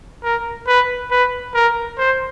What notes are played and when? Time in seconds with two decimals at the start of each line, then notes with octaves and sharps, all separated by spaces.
0.24 A#4
0.67 B4
1.11 B4
1.55 A#4
1.98 C5